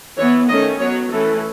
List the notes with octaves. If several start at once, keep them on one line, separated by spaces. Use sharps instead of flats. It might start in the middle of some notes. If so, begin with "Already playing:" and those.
E3 B3 C#5
D#3 A3 C#4 D#5
F#3 B3 C#5
E3 A3 C#4 A4